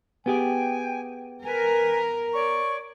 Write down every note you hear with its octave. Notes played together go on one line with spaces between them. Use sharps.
B3 G4 G#4 G5 G#5
A#4 B4 G#5
C#5 D5 C#6